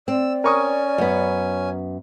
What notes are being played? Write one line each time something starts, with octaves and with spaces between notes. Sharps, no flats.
C4 D5 E6
C#4 A#4 G#5 C#6 D#6
F#2 B3